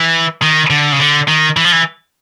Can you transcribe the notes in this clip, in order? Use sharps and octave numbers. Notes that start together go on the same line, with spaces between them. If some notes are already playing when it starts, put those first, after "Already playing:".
Already playing: E3
D#3
D3
C#3
D3
D#3
E3
F3
E3